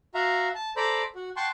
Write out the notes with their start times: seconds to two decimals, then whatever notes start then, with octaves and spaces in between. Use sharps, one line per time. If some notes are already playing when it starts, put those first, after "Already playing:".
0.15 F#4 E5 F5 A#5
0.55 A5
0.77 A4 C5 D5 A#5 B5
1.15 F#4
1.36 F#5 G5 A5 C6 C#6